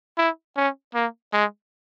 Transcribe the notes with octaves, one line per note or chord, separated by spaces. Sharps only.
E4
C#4
A#3
G#3